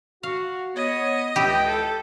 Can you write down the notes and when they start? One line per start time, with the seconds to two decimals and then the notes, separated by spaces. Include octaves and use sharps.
0.23 F#4 F5
0.75 B3 C#5 D#5
1.36 C#2 E4 G4 G5
1.67 A4